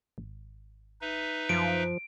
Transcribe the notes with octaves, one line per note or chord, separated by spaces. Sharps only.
G#1
D#4 B4 E5
F#2 F3 D7